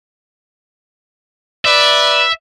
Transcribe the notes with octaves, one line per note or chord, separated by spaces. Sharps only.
B4 D5 E5